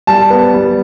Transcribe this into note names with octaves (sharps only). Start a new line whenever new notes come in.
G3 A5
B3
G3